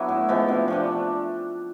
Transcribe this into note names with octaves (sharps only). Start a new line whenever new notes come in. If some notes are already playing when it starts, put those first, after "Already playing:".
Already playing: F#3 B3 D4 E4
A2
F3 G#3 B3
C3
F3 A3 D4